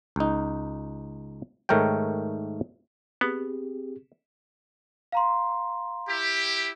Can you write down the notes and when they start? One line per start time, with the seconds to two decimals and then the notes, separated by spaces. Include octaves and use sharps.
0.16 C#2 D#4
1.69 G#2 D#3 A3 A#4 C#5 G5
3.21 B3 C4 G4 G#4
5.12 F5 A#5 C6
6.08 E4 G4